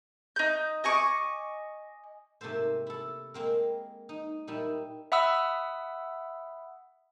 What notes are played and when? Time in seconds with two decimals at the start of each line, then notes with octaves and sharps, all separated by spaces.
0.36 D#4 G6
0.84 D#5 G#5 C#6 D6
2.41 G#2 C3 A3 A#3 A4 C5
2.87 E4 A4
3.34 G#3 A#3 C4 A#4
4.09 D#4
4.47 A#2 G3 D#4 E4
5.12 E5 F#5 B5 D#6 E6